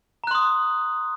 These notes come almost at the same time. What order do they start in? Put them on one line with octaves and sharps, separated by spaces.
A#5 F#6 C6 D#6